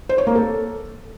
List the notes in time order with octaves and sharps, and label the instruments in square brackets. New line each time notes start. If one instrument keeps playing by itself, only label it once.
[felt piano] C5
C#5
A#3
A4